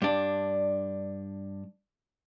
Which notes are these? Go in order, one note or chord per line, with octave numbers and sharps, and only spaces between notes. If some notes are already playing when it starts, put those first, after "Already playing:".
G2 D4